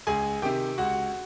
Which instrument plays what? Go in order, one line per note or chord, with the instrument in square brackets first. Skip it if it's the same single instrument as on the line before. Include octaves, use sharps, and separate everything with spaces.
[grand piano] C#2 G#4 G#5
C3 D#3 G4 G5
C#2 F#4 F#5